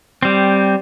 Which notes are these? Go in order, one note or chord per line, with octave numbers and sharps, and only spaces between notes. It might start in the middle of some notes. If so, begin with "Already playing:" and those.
G3 C4